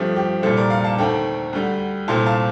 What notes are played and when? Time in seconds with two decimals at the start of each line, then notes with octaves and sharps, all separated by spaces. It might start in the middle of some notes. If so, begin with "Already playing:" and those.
Already playing: G2 F3 A3 C4 G4
0.16 G4
0.43 C2 A#2 G3 A4 C5
0.57 A#4 D5
0.70 D5 F5
0.84 F5 A5
0.98 D#2 D3 A3 C4 G5 A#5
1.53 D2 D3 G3
2.08 C2 A#2 A3 C4 A5 C6
2.26 F5 A5